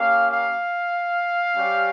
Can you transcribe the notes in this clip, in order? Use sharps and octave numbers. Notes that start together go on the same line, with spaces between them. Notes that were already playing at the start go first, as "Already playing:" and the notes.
Already playing: A#3 C#4 G4 F5
F5
G3 C#4 G4